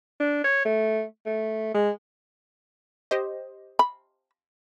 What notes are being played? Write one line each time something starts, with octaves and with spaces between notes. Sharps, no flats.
D4
C#5
A3
A3
G#3
G4 C5 D#5
B5